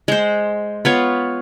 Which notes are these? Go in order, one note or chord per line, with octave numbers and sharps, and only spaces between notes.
G#3 C5
B3 F4 C#5